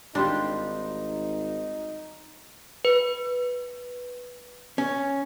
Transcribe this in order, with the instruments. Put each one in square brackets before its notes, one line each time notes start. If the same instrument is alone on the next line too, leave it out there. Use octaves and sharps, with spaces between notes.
[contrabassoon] G#1 [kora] G3 F4 G4 [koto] D4 [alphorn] D#4
[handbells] B4
[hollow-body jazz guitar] C#4